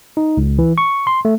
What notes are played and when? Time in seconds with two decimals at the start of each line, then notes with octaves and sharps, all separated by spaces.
0.17 D#4
0.37 C#2
0.59 E3
0.78 C#6
1.07 C6
1.25 A3